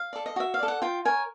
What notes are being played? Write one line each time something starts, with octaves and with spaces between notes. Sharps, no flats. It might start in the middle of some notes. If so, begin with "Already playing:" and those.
Already playing: F5
A4 D5
D#5
F#4 E5
F5
A4 D5
F#5
F4 G5
A#4 C#5 G#5